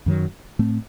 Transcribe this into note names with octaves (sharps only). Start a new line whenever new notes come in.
F#2 D#3 F#3
A2 A3 C4